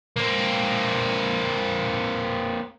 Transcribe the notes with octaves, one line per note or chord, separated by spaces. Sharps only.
A#3 C4